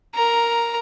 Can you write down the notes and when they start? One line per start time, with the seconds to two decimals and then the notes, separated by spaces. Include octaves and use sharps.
0.15 A#4 A#5